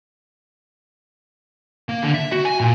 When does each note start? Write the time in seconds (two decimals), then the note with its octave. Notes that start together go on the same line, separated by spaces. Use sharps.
1.89 A#3
2.02 D3
2.14 E5
2.32 F#4
2.45 G#5
2.60 A#2